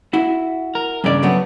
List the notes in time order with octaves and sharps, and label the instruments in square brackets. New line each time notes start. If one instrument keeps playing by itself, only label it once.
[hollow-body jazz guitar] E4 F#4
[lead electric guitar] A#4
[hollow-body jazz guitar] E2 D5 [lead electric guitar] G2 C#3
[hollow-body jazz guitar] F#3 A3 B3